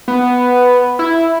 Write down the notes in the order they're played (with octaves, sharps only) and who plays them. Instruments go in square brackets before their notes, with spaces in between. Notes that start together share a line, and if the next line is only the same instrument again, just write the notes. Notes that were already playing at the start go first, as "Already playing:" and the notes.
[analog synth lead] B3
E4